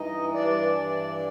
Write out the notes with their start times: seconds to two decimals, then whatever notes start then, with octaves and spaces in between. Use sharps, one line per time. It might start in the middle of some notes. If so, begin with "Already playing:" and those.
Already playing: G2 E3 D#4 D#5
0.34 G2 D4 D5
0.79 E3